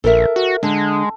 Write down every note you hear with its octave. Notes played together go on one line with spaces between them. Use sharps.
A#1 A4 A#4 E5
F#4
D3 G#3